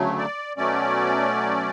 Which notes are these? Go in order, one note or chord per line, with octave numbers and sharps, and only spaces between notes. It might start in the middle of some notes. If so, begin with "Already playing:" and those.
Already playing: D2 C#3 F#3 A3
D5
B2 F#3 A3 C#4 D5